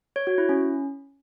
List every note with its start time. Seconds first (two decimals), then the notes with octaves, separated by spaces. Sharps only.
0.16 C#5
0.27 F#4
0.38 E4
0.49 C#4